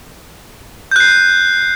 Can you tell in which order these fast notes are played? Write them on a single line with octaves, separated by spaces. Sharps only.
G6 F#6 C7